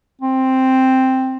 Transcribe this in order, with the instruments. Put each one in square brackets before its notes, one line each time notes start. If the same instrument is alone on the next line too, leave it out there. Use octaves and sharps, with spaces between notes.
[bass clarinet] C4